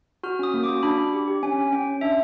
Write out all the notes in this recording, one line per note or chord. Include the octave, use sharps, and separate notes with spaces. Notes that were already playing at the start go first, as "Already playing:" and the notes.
F#4 F6
C#4 D#6
A#3
F#4 D6
D4 B5
D4
G4
G4
C#4 G#5
C#4
C#4 G5
C#4
D4 E5